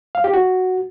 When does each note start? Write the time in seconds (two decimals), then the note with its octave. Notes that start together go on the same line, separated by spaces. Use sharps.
0.15 F5
0.24 G4
0.34 F#4